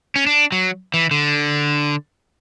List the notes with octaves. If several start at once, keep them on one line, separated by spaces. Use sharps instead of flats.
C#4
D4
F#3
E3
D3